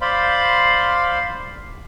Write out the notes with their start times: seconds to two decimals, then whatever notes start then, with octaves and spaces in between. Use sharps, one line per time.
0.01 C5 D5 F5 B5 C6